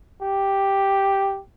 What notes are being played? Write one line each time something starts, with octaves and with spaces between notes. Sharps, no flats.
G4